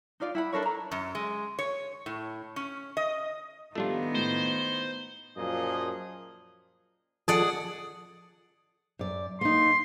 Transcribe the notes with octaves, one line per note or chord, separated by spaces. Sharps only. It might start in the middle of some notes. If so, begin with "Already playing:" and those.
D#4 F4 D5 F5
E4 F#5 B5
D4 A4 A#4 C#5
A#5
F#2
G#3
C#5
A2
C#4
D#5
D#3 F3 G3 A3 B3 D4 F4
A2 C5
F#2 A#2 F3 G#4 D#5
F3 G#4 A4 D5 F#5
F#2 D5
A#3 D#4 C6